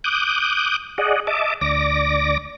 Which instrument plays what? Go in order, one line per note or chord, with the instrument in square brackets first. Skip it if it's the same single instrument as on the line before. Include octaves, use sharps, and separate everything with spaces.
[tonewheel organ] D6 D#6 F#6 G6
G#4 D5 D#5 F#5
D#5 E5 A5 D6
D2 D5 D6 A#6